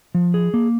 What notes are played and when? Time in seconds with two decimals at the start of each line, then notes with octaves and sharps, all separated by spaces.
0.14 F3
0.34 G#4
0.54 A#3